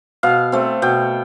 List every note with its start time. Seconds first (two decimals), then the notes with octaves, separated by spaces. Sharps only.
0.23 B2 F5
0.52 A3 C4
0.82 B2 G5